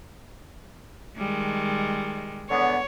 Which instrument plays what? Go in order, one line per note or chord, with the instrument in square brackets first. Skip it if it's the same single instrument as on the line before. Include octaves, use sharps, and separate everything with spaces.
[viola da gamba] D#3 G3 G#3
[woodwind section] E2 D3 B3 [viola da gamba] C#5